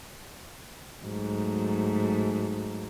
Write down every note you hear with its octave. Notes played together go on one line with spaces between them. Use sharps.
G#2 F#3 A3